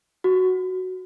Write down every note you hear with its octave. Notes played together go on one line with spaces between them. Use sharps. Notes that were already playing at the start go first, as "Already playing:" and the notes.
F#4